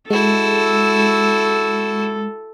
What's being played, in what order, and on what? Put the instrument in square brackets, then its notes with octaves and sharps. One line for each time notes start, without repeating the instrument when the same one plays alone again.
[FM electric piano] G#3 [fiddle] E4 F#4 [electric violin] A4